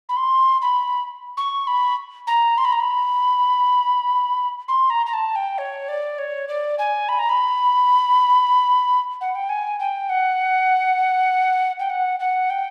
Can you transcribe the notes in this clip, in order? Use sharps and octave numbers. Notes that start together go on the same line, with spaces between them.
B5
C6
B5
C#6
B5
A#5
C6
B5
A#5
B5
C6
A#5
A#5
A5
G5
C#5
D5
C#5
D5
G#5
B5
A#5
B5
F#5
G5
G#5
G5
F#5
G5
F#5
F#5
G5